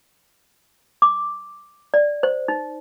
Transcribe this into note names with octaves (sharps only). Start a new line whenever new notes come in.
D6
D5
C5
D#4